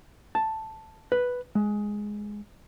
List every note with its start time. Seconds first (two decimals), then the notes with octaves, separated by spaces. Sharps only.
0.35 A5
1.12 B4
1.55 G#3